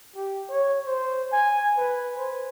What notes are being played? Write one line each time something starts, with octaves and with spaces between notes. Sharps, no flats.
G4
C#5
C5
G#5
B4
C5